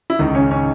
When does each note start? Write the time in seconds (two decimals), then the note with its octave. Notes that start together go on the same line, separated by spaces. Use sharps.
0.10 E4
0.19 C#2 D#3 D#4
0.35 C#3 C#4 C#5
0.51 C#4 C#5